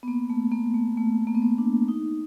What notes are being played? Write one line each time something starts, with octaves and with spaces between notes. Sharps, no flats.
B3
A#3
A3
A#3
A3
A3
A#3
B3
A#3
D4
D#4